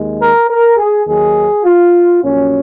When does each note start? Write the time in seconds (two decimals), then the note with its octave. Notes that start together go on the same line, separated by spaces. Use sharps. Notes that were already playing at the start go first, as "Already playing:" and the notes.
Already playing: D#2 D#3 G#3
0.19 A#4
0.49 A#4
0.77 G#4
1.06 D#2 D#3 F#3 G#4
1.64 F4
2.22 A#1 A#2 F#3 C#4